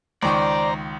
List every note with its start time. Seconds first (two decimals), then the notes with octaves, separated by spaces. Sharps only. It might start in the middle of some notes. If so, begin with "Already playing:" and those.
0.23 C#2 D#3 C5 D5 A#5 C#6